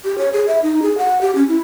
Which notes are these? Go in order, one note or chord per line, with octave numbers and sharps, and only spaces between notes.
G4
C#5
G#4
E5
D#4
G#4
F#5
G4
C#4
E4